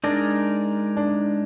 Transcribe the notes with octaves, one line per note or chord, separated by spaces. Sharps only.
G#3 D4 D#4 A#4 D5
D4